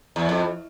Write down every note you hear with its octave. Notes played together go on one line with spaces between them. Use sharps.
E2
F2